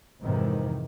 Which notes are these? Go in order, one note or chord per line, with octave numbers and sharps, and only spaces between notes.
F2 G#2 C3 D#3 E3